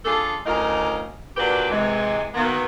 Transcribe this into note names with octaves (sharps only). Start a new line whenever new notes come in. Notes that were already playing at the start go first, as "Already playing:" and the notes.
D4 F4 G#4 A4
D2 A2 C#4 A#4 D#5 F5
A#2 F#3 D4 G4 B4
C3 E3 G#3
D#3 F#3 A#3 B3